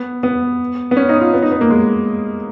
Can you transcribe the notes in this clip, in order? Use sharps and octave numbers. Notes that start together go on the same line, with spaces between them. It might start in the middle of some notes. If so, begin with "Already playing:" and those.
Already playing: B3
B3
B3
C#4
D#4
F4
B3
D#4
B3
A#3
G#3